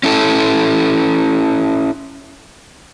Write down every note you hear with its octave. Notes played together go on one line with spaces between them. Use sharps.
C#4 E4 A4